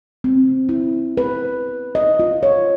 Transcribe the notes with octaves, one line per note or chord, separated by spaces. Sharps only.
C4
E4
B4
D#5
F4
C#5